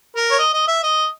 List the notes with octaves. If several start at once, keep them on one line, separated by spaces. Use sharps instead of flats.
A#4
C#5
D#5
D#5
E5
D#5